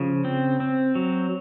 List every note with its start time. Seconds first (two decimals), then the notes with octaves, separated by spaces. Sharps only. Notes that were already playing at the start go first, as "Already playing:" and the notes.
Already playing: C#3 F3
0.25 C4
0.60 C4
0.95 F#3